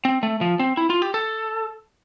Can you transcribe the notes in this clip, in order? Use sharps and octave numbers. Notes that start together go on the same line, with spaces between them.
C4
A3
F3
C4
E4
F4
G4
A4